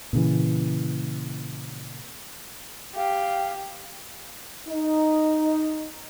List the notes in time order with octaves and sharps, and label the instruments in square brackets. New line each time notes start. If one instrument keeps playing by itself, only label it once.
[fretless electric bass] A#2 C#3 E3
[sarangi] G4 [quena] F5
[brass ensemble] D#4